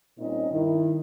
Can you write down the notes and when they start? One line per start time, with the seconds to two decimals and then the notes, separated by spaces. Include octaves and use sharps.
0.19 A#2 G3 C4 C#4 D#4 D#5
0.51 G2 D#3 E4